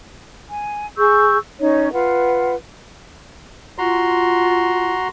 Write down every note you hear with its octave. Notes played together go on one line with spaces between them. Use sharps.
G#5
G#4 C#6 E6 G6
C#4 D#4 C#5
F4 B4 F#5
F4 F#4 A#5 C6